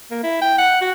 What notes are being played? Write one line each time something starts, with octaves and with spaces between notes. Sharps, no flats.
A#3
E4
G5
F#5
F#4